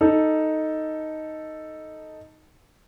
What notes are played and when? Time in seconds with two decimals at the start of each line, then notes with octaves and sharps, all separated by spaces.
0.01 D#4 A4